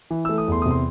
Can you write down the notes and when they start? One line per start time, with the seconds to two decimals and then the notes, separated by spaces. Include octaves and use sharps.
0.11 E3
0.25 A3 E6
0.38 D#6
0.48 E2 C6
0.62 C3 D#6
0.71 C6